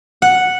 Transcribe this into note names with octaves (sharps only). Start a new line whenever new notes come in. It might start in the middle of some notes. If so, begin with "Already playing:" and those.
F#5